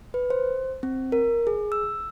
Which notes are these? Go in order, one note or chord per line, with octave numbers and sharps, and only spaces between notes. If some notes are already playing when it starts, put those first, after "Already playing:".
B4
C5
C4
A#4
G#4
E6